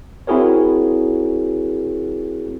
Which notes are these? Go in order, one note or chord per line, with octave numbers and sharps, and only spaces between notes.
C4 E4 F#4 G#4 A#4 C#5